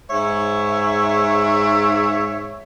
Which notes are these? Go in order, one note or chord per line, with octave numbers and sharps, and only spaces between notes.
G#2 C#5 E5